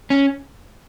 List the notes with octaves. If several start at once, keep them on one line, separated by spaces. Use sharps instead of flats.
C#4